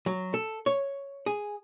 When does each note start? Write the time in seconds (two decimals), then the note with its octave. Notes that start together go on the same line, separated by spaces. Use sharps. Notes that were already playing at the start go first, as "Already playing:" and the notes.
0.06 F#3
0.34 A4
0.66 C#5
1.26 G#4